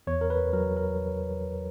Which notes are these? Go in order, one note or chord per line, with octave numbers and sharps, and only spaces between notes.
E2 C#5
A#4
B4
F#3 A#4
A#4